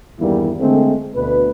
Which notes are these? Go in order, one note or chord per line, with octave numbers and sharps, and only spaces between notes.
E2 G2 D#3 G3 A#3 E4
D3 G#3 A3 C4
D2 B2 B4